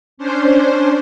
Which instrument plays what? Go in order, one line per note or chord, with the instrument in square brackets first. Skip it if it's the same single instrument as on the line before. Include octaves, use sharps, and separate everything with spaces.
[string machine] C#4 D4 C5